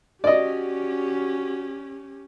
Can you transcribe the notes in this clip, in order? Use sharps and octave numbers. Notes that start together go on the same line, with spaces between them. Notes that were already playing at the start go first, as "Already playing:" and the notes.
C#4 F#4 G4 D5 D#5